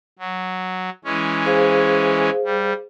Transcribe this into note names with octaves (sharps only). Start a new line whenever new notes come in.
F#3
E3 G#3 C#4
G#4 C5 F5
G3